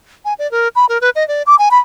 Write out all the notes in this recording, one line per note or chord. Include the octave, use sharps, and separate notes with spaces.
G#5
D5
A#4
B5
A#4
B4
D#5
D5
D6
G#5
B5